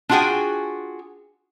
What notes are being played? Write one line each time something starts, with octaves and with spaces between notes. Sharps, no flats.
D4 F4 F#4 G#4 G5 G#5